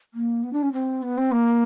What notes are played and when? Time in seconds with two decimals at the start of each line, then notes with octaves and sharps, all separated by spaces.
0.14 A#3
0.43 B3
0.52 D4
0.62 C#4
0.72 C4
1.02 B3
1.17 C4
1.31 A#3